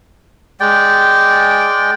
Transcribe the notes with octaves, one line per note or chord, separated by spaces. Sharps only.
G#3 D5 G5